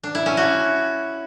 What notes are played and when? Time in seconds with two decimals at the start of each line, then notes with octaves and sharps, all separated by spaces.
0.03 D4
0.15 E4
0.26 C#4
0.37 F#4